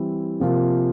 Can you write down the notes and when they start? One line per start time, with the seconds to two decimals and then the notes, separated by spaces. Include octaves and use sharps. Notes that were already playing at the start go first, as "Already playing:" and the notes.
Already playing: E3 G3 C4 E4
0.40 C3 F3 A#3 F4